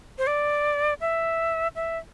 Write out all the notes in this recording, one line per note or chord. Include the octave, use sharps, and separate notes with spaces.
C5
D5
E5
E5